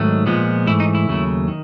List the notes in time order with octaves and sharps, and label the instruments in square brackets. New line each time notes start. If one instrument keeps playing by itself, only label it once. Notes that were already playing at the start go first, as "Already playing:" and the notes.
Already playing: [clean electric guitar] G#2 D#3 F#3 A3
A#2 F3 G#3 B3
G#2 E3 A3 E4
D#4
E4
D#2 C#3 F#3 A3
D#3